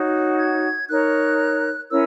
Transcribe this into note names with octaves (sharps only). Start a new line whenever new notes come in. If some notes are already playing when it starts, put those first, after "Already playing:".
Already playing: D#4 F#4 C#5
G#6
D#4 A#4 C#5 F#6
C#4 E4 A#4 C#5 E6